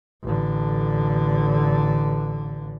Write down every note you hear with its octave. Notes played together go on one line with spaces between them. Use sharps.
A1 D3